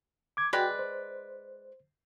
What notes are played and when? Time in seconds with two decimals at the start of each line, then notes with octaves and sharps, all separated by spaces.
0.37 D6 G#6
0.53 G#3 F#4 B4 D5 G5
0.79 C5